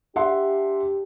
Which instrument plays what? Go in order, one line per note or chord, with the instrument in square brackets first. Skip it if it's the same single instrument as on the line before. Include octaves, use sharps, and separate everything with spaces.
[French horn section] D4 G4 [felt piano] E5 F#5 C6